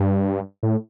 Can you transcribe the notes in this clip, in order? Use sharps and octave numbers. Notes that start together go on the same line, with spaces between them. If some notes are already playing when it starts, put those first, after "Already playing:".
Already playing: G2
A2